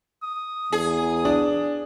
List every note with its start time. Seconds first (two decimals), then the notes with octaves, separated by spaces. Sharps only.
0.23 D#6
0.72 E2 G#4
1.25 D4